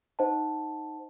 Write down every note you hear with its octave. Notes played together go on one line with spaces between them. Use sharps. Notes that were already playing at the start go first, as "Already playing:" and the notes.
D#4 C5 D#5 F#5 A5